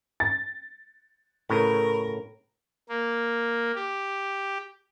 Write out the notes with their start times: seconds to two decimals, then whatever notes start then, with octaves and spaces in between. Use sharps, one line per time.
0.20 A6
1.50 A2 C#3 A#4 B4
2.89 A#3
3.76 G4